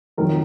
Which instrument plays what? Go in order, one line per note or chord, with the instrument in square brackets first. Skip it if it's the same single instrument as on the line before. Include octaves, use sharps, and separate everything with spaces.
[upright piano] F2 D#3 F#3 A#4